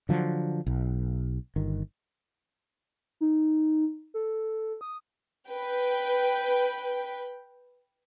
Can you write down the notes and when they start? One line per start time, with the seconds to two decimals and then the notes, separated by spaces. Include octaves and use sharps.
0.09 D3 F3 F#3
0.66 B1
1.56 G1 D#3
3.21 D#4
4.14 A4
4.81 D#6
5.50 B4 G5